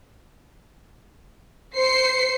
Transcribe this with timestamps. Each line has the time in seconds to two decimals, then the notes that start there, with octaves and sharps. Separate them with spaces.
1.75 C5 C7 C#7